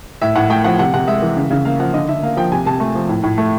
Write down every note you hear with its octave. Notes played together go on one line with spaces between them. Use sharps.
A2 E5
A2 F#5
A3 G5
F3 F#5
C3 F#5
C3 F#5
G#3 E5
E3
C#3
C#3
A#3 F5
F3 F#5
D3 D#5
D3 E5
A#3 F5
F3 G5
C3 G#5
C3 A5
A3
F3
A2
A2
A3